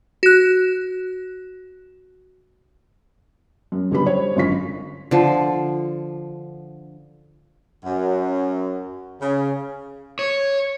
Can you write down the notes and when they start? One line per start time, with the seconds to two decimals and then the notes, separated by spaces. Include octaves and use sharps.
0.23 F#4 F#6
3.72 F#2
3.91 F#1 D3 G3 B3 G4 B5
4.06 C5 C#5
4.36 G#1 F#2 D3 F4 C#6 B6
5.11 D3 F3
7.85 F#2
9.20 C#3
10.19 C#5